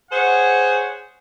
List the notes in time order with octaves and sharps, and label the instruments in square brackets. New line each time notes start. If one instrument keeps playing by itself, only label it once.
[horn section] G#4 C5 C#5 F#5